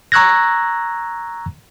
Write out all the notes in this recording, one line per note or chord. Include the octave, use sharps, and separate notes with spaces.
A#5 C#6 E6 F#6 G#6 A#6